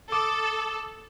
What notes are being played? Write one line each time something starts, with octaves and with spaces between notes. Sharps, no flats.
A4 D6 D#6